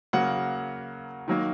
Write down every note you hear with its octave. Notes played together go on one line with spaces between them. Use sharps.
C#3 F#3 A#3 F#5
D#3 F#3 A#3